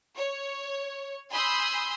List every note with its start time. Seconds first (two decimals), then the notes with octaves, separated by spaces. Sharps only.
0.15 C#5
1.32 G#5 B5 C6 D#6 E6 G6